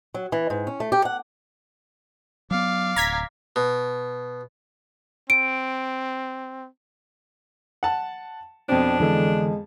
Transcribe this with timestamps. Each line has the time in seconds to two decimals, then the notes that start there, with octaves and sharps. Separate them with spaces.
0.14 F#3
0.32 E3
0.50 G#2
0.67 C#4
0.80 A3
0.92 G4
1.05 F#5
2.51 F#3 B3 D5 F5
2.96 D1 A#5 G#6 B6
3.56 B2
5.30 C4 D7
7.83 F#5 A5
8.69 F2 B2 C4 D4
9.00 D3 E3 G#3 A4